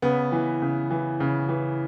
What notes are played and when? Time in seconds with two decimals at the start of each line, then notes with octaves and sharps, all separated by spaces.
0.02 C#3 B3
0.32 E3
0.62 C#3
0.91 E3
1.20 C#3
1.49 E3